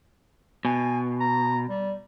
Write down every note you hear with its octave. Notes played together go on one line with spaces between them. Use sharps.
B2 G#5
A#5
G3